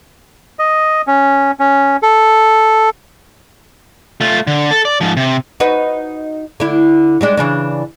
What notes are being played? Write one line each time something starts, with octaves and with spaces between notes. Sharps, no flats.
D#5
C#4
C#4
A4
A3 F4
D3
A4
D5
G#2 F3
C3
D#4 F#4 B4
D3 E4
G3 G#3 D4
C#3 E3 D4